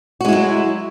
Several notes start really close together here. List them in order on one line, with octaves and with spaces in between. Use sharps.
F#4 G#3 E4 F#3